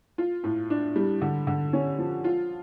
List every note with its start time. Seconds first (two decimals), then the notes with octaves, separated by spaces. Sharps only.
0.18 F4
0.44 A2
0.70 D4
0.96 G3
1.22 D3
1.47 D3
1.73 C#4
1.98 F3
2.24 F4